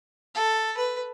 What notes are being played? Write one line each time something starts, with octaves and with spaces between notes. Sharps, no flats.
A4
B4